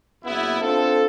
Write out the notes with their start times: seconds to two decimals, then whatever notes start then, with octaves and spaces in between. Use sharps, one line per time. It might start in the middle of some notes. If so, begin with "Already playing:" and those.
0.24 F#1 B3 E4
0.61 C4 D4 F4 A4